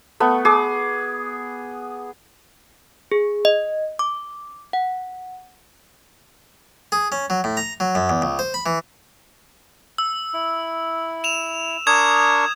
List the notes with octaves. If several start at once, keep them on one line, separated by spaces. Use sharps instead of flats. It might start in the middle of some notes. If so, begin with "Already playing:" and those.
A3 B3
G#4 D6
G#4
D#5
D6
F#5
G#4
C#4
F#3
A2
A#5
F#3
F#2
E2
C#2
C5
B5
E3
E6
E4
E7 F7
D4 A#4 C#6 D#6 G#6 E7